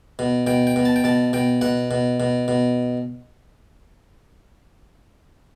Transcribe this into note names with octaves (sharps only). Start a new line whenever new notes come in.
B2
B2 G5
G5
B2
A5
G5
B2 A5
B2 G5
B2 F#5
B2
B2
B2